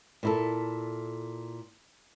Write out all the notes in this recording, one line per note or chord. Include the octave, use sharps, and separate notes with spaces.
A#2 E4 A4